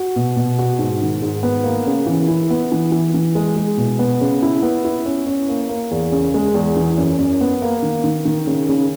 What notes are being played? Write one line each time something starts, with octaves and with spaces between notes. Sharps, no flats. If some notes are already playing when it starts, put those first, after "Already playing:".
Already playing: F#4
B2
B2
F#4
G#2
D#3
G#2
B3
A#3
C#3
E3
E4
B3
E3
E3
E3
G#3
G#3
B2
B3
C#3
E4
B3
E4
C#4
C#4
A#3
A#3
E2
C#3
G#3
E2
E3
F#2
F#2
B3
A#3
D#3
D#3
D#3
C#3
C#3